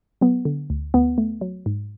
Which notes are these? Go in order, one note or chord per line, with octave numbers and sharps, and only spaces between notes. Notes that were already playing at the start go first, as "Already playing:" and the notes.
F#3 B3
D3
D2
D2 B3
A3
F#3
G#2